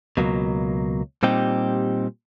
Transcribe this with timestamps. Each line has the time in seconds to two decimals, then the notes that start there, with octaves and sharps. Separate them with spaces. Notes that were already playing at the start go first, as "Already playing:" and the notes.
0.17 C#2 B2 F#3 A#3
1.23 A#2 G3 C4 D#4 G4